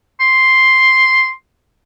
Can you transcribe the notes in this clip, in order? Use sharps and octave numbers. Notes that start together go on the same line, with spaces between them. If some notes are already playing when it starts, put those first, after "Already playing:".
C6